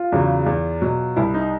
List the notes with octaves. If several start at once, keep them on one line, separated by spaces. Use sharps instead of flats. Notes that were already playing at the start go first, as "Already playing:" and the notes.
Already playing: F4
E2 C#3 F#3
E2
B2 F#3
C2 E4
D#4